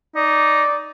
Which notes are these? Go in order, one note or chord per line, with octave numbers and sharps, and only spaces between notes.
D#4 D5